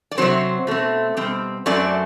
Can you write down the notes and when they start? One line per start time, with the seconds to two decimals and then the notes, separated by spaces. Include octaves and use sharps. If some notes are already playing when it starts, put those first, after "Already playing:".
0.11 D5
0.18 C3 F#3 C4 C5
0.67 B2 A3 C4
1.17 B2 G3 C4
1.66 F#2 F#3 A3 C4 D5